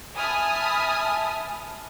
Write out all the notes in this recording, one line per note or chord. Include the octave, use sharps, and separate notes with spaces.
E5 G#5 A5 B5 D#6 F6